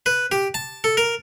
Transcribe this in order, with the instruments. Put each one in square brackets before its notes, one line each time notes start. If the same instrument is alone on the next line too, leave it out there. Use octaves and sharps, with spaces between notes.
[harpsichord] B4
G4
A5
A4
A#4